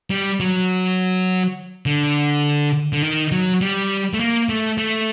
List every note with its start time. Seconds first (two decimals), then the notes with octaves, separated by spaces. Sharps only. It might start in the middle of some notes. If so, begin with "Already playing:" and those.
0.10 G3
0.40 F#3
1.86 D3
2.93 D3
3.02 D#3
3.32 F#3
3.61 G3
4.14 A3
4.20 A#3
4.49 A3
4.78 A3